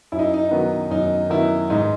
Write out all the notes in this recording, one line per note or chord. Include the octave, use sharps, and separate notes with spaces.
F#2 E4
D#4
D#4
D#3 F#3 B3
F#2 D#4
D#3 F#3 B3 E4
G#2 D#4